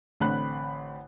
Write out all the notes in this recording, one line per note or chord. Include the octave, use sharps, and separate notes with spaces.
A1 D3 C4 B5 F#6